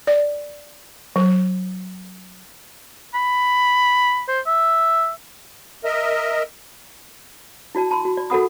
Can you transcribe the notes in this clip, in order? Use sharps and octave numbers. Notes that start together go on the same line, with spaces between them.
D5
F#3
B5
C5
E5
A#4 D#5 E5
E4 F#4 D5 A5
A5 B5 C6
F#4
D5
F#4 A4 A#4 F#5 B5 D#6